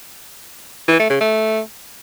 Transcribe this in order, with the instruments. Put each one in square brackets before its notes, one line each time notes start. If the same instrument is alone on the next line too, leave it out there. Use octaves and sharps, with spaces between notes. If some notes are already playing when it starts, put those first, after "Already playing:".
[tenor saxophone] E3
A3
C#3
A3